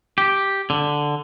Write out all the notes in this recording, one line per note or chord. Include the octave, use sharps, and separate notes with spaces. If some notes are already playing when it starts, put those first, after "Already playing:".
G4
D3